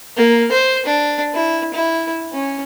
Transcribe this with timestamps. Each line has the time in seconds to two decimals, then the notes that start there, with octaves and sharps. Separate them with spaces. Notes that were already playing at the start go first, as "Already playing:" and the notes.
0.17 A#3
0.52 C5
0.86 D4
1.34 E4
1.74 E4
2.33 C#4